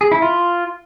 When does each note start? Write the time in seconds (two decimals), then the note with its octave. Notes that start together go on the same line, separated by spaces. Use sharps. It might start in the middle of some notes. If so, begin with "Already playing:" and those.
0.01 G#4
0.12 E4
0.22 F4